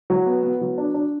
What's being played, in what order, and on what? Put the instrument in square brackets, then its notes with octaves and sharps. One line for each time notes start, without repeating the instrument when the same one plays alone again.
[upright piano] F#3
B3
B3
F#3
D4
D4